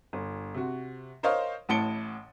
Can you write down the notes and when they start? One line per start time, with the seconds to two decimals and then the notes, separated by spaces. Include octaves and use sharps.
0.13 G1
0.54 C3 F#4
1.23 A#4 C5 C#5 D#5 F5 C6
1.69 A1 A2 A5 C#7 D7 G7